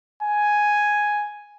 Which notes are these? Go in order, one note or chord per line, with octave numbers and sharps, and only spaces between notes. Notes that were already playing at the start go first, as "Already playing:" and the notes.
G#5